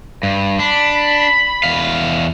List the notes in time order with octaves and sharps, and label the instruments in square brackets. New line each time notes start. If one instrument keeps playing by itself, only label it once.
[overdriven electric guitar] G2
[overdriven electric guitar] D4 [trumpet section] B5
[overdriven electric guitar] E2 F5